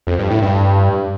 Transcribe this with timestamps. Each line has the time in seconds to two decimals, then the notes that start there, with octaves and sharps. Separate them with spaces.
0.07 F2
0.19 G2
0.30 A2
0.42 G2